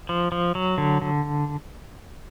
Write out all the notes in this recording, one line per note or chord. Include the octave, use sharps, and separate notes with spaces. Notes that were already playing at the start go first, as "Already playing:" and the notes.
F3
F3
F#3
D3
D3